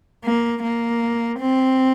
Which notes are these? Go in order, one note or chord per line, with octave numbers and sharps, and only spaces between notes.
A#3
A#3
C4